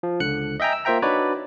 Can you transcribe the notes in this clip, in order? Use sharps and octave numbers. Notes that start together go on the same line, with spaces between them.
F3
C#2 D3 F#6 C#7
D#5 E5 G5 G#5 A#5
E6
A#3 F4 C5 E5 G5 A#5
D4 D#4 F#4 B4 C#5 D5